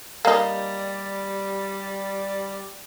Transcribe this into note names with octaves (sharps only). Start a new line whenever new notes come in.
G3 A#3 D#4 D5